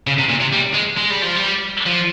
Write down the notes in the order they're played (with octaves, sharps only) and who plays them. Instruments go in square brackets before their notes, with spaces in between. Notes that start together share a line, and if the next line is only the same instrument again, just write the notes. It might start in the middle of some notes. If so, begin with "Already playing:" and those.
[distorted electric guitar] C#3
C3
A#2
C3
G3
G#3
G#3
G3
F3
G3
F3